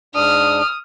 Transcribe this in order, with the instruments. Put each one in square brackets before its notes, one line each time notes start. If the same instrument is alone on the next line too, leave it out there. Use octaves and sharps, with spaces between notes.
[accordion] G#2 D4 [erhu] D#6 [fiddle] F6